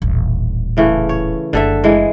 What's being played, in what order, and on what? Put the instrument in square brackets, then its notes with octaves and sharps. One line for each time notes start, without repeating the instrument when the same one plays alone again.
[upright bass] D#1 A1
[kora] C#3 E3 A3
C#5
[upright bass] F#1 A3 [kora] D3 A4 E5
[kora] E3 G#3